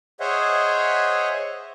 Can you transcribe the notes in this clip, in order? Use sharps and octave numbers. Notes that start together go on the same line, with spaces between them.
G#4 C5 C#5 D#5 E5 F#5